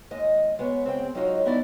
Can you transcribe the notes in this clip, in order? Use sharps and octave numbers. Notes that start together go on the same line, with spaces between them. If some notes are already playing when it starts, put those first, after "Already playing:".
D#2 G#3 D#5
G#3 B3 C#5
C#3 C4 G#4 G5
F#3 G#3 D#4 F4 F#4 C#5
G3 B3 D#4 E4 F#4 D5